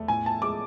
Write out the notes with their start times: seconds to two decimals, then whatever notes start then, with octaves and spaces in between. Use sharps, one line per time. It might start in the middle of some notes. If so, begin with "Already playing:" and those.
Already playing: E2 A3
0.08 A2 G#5
0.26 A5
0.42 G#3 D6